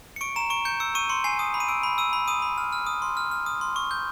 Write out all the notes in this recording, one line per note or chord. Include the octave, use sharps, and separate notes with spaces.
C#7
C#6 D7
A#5 E7
C#6 D7
G6 C#7
E6 C#7
C#6 D#7
C6 C#7
G#5 C7
D#6
B5
D#7
E6 D7
B5
E6 D#7
B5
D#6 D#7
B5
F6
F6
D#6
C6
F6
F6
D#6
C6
C#6
G6